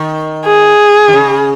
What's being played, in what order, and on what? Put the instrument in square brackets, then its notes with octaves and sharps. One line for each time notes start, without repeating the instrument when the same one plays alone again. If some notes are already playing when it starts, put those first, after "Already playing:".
Already playing: [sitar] D#3
[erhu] G#4
[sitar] D#3
C#3